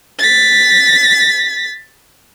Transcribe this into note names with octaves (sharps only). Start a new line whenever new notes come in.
A6 B6